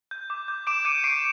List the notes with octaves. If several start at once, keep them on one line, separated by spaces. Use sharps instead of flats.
G6
D6
G6
D6 D7 E7
G6 C#7 D#7
C#6 C7 D7